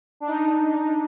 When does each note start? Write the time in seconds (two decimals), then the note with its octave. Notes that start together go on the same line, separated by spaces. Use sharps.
0.20 D4
0.28 D#4